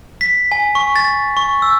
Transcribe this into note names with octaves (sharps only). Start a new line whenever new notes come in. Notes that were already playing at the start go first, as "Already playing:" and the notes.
B6
G#5
C#6
A6
C#6
E6